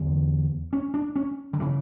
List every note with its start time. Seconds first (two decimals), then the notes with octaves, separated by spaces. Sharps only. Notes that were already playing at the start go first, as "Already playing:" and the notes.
Already playing: E2 D3
0.73 C#4
0.94 D4
1.16 C#4
1.53 D3
1.60 C#3 E3